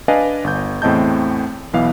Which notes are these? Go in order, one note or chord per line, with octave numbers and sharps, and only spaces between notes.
D4 B4 D5 D#5 F5 G#5
G1 G6
E2 A2 C4 D#5 A5 G6
B1 E3 B3 F5